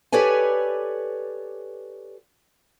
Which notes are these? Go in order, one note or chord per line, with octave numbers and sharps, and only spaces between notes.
G4 A4 B4 C#5 D5 G#5